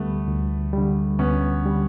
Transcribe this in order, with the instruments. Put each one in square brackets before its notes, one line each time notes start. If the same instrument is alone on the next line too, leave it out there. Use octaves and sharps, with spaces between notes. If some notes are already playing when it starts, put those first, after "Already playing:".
Already playing: [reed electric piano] D2 D3 G3 [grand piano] A3 B3
[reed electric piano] D2
D3 G3
[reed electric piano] D2 [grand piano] B3 C#4
[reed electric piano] D3 G3